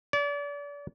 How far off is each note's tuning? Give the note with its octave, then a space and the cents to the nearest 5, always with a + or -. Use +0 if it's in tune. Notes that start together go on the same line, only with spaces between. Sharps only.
D5 -35